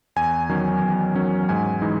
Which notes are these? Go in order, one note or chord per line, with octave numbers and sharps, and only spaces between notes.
E2 G#5
D#3 F#3 C#4
E2
D#3 F#3 C#4
G#2 G#5
E3 G#3 D#4